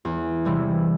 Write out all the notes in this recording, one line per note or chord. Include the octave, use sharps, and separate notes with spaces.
E2
C3 E3 G3